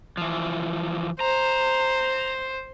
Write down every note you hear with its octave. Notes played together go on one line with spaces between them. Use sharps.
E3 F3
C5 A#5